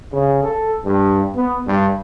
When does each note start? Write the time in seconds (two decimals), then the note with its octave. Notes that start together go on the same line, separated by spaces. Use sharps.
0.13 C#3
0.44 A4
0.85 G2
1.36 B3
1.67 G2